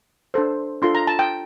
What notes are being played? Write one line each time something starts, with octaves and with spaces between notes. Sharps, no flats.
D4 A4 C5
D4 F4 A4 C6
A#5
A5
G5